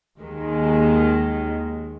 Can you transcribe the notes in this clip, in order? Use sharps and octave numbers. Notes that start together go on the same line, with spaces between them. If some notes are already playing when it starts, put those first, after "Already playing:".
D#2 D#3 G#3